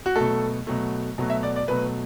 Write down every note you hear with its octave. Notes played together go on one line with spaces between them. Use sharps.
F#4
B2 F#3 A3 A4
B2 F#3 A3
B2 F#3 A3
E5
D5
D5
B2 F#3 A3 B4